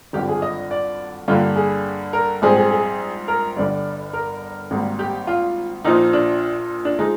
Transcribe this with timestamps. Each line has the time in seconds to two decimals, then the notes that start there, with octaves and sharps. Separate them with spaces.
0.13 G#1 G2 D3 F3 G4
0.29 G#4
0.42 D#5
0.71 D5
1.28 G2 D3 G3 A#3 F4
1.56 G#4
2.13 A#4
2.42 A#1 G#2 G3 C4 G#4
2.57 G#4
2.71 G#4
3.28 A#4
3.56 G1 G2 D3 G3 D5
4.13 A#4
4.71 G#1 G#2 G3 A#3
4.99 G4
5.27 F4
5.84 A#1 A#2 F3 D#4
6.13 D4
6.85 D4
6.99 F3 G#3 D#4